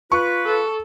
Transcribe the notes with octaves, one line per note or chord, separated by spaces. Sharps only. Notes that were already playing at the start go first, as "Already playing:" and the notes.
F4 B4 C#6
A4